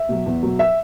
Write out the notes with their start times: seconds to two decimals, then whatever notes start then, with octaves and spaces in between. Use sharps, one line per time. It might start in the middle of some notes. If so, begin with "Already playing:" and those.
Already playing: E5
0.09 B2 F#3
0.26 E2
0.43 B2 F#3
0.59 E5